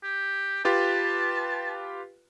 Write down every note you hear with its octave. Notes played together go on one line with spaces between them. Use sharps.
G4
F4 G4 B4 A5